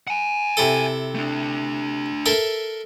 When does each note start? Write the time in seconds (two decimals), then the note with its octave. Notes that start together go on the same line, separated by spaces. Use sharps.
0.07 F#5 G#5
0.57 C3 E4 A4
1.15 A3 D4
2.26 A4 A#4 E5